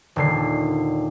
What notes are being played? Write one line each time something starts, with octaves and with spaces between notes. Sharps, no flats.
D#1 D3 C7